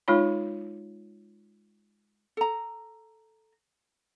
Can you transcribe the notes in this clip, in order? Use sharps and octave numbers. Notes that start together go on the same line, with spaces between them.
G#3 D#4 F4 C#5 B5
A4 A#5